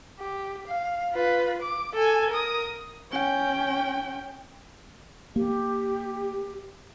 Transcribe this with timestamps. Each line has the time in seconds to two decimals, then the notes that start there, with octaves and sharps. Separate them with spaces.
0.19 G4
0.67 F5
1.12 F4 B4
1.62 D6
1.94 A4 G#5
2.30 A#4 D#6
3.11 C#4 G5
5.36 A#3 G4